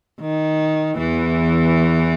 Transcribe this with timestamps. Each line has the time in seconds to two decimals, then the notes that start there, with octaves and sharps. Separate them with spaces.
0.20 D#3
0.98 E2 E3